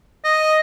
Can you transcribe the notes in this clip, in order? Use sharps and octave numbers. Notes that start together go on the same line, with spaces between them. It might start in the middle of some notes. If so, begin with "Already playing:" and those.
D#5